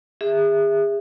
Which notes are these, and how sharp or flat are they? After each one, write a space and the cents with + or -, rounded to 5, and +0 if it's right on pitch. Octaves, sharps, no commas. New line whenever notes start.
G#4 -35 E5 +0